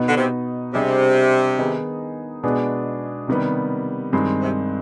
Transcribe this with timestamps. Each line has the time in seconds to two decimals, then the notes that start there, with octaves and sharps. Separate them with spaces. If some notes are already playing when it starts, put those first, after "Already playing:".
Already playing: B2 B3 D#4
0.08 D3
0.17 C3
0.74 C3 G3 D4 G#4 C5 D#5
1.59 D#3 B3 D#4 G#4
2.43 B2 G#3 B3 D4 G#4
3.28 C3 D#3 G3 B3
4.13 G2 D#3 G#3 C4
4.41 C3